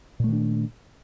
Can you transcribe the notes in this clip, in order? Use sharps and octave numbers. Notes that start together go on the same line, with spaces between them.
A#2 D#3 A3 D4